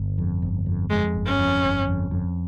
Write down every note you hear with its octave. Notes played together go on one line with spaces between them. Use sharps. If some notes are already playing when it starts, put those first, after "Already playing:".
Already playing: G1
F2
G1
F2
F2 G#3
G1
C#4
F2
G1
F2
F2